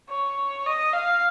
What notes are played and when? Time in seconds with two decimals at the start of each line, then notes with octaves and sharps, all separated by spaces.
0.09 C#5
0.66 D#5
0.94 F5